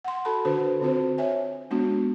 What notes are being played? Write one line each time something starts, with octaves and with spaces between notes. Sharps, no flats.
F#5 C6
F#4 A4 A5 B5
D3 D4 F#4 A4 B4 C5
D3 C4 F4 F#4 C5
C#5 E5 G#5
G#3 B3 D4 F#4